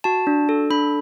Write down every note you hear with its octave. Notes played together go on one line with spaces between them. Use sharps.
F#4 A5
D4
A4
D4 B5